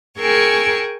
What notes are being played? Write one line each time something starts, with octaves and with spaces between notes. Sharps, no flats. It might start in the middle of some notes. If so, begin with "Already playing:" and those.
G#4 A#4 G5 G#5 C#6 E6